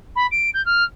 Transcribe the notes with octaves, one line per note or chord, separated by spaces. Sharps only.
B5
D7
G6
F6